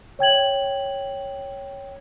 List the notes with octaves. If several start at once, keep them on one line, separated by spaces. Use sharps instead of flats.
C#5 G5 G#6 F#7